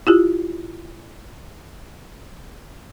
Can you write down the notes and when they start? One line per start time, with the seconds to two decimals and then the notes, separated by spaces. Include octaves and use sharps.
0.07 E4 F4 G4